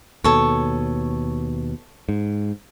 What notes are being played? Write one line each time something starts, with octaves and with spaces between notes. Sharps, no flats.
D#2 B2 A4 C#5
G#2